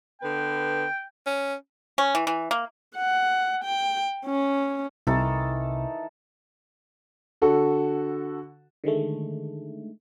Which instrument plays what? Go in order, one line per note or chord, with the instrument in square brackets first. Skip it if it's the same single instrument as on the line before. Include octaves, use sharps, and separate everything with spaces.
[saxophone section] D3 B3 B4 [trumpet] G5
[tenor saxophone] C#4
[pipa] C#4
E3
E3
A#3
[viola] F#5
G5
C#4
[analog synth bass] C2 [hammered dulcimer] D#3 E3 A4
[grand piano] D3 F#4 A4
[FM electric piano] D3 D#3 G#3 A3